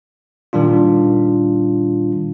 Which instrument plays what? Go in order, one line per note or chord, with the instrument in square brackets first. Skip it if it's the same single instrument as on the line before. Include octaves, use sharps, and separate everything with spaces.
[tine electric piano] A#2 D#3 G3 D4 F4